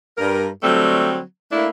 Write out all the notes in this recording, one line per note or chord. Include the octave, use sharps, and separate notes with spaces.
G2 A#4
D3 F#3 G3 A3 C4
A3 A#3 D4 E4